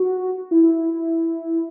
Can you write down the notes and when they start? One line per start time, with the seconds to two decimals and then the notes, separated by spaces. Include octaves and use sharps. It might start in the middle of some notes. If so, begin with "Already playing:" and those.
Already playing: F#4
0.51 E4